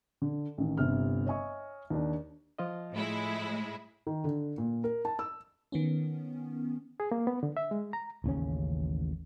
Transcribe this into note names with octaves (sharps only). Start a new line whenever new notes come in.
D3
A1 D#3
G1 C3 F6
C#5 D#5 E5 G#5 C#6
D#2 D4
F3 F4 D#5
A2 G#3 E4
D#3
D3
A#2
A#4
A5
E6
D#3 B3 C#4
G#4
A#3
B3
D3
E5
G#3
A#5
A1 D#2 C#3 C#4